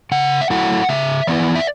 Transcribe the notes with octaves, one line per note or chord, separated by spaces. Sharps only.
C#3 F#5
E5
F#3 A3 E4 F#5
C#3 E5
E3 B3 E4 D5
E5